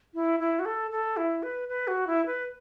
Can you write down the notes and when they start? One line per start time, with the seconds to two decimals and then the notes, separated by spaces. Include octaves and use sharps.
0.14 E4
0.40 E4
0.59 F#4
0.65 A4
0.91 A4
1.17 E4
1.43 B4
1.69 B4
1.88 F#4
2.07 E4
2.26 B4